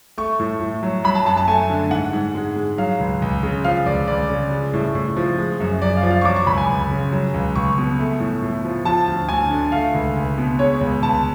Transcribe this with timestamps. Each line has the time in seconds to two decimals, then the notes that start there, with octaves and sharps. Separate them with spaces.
0.18 A3 C#6
0.40 A2
0.60 A2
0.83 F#3
1.04 F#3 B5
1.15 A5
1.26 F#2 A5
1.37 A5
1.48 A3 G#5
1.70 D3
1.91 G#2 F#5
2.13 G#2
2.35 G#3
2.56 G#3
2.78 F#3 F5
3.00 C#2
3.22 C#2
3.43 C#3
3.64 F3 F5
3.86 C#2 D5
4.08 C#2 D5
4.29 C#3
4.51 G#3
4.74 A2
4.95 A2
5.17 F3
5.38 G#3
5.60 F#2
5.82 F#2 D5
5.97 F5
6.03 F3
6.11 F5
6.21 C#6
6.25 F#3 D6
6.36 C#6
6.46 C#2 B5
6.57 G#5
6.69 C#2
6.91 C#3
7.12 F#3
7.34 C#2
7.55 C#2 C#6
7.78 B2
7.99 A3
8.20 A2
8.42 A2
8.65 F3
8.85 F3 A5
9.07 D2
9.29 D2 G#5
9.51 D3
9.72 A3 F5
9.94 C#2
10.16 C#2
10.38 B2
10.59 G#3 C#5
10.81 C#2
11.03 C#2 A5